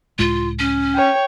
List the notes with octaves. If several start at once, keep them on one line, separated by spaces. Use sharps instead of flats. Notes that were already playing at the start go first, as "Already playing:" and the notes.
C#2 A2 G#3 F4
C#4
C#5 G5